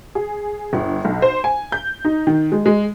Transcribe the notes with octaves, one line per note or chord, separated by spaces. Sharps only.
G#4
G1
B1
C5
G#5
G6
D#4
D#3
G#3
G#3